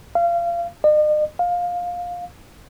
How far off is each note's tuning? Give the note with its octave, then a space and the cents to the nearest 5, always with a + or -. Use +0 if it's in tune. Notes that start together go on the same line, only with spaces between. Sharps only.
F5 -30
D#5 -45
F5 +15